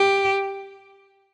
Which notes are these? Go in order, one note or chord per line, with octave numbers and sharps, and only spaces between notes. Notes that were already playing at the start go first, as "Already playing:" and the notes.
Already playing: G4